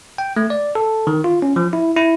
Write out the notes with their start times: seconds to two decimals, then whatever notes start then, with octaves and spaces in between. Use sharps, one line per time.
0.18 G5
0.36 A3
0.50 D5
0.75 A4
1.07 D#3
1.24 F4
1.42 C#4
1.56 F3
1.73 E4
1.96 E4